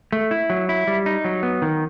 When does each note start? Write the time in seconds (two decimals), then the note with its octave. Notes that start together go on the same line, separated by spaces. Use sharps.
0.12 A3
0.31 E4
0.50 F#3
0.69 E4
0.87 G3
1.06 D#4
1.25 F#3
1.43 B3
1.62 D#3